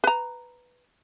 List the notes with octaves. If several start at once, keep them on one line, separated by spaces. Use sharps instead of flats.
B4 A#5